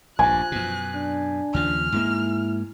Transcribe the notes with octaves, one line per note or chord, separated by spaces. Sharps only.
A#1 G2 F3 G#5 F#6
F#2 B2
D4
D#2 C#3 F3 F6
G#2 G#3 A#3 E4